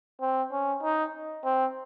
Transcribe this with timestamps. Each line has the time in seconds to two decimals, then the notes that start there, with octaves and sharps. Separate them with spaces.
0.21 C4
0.52 C#4
0.83 D#4
1.44 C4